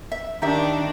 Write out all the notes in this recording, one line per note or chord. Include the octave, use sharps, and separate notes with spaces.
E5
D#3 D4 D#4 G4 E5